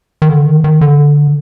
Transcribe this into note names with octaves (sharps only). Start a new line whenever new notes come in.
D#3
D3
D#3
D#3
D3